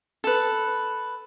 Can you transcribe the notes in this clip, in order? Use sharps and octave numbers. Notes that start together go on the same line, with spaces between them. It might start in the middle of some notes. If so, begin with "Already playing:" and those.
A4 B4